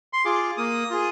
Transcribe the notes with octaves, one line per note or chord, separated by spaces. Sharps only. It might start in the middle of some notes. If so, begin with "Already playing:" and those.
C6
F4 G#4 D6
A#3 D#6
F4 G#4